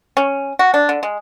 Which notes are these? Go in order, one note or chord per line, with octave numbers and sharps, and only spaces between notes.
C#4
F#4
D4
D3
G#3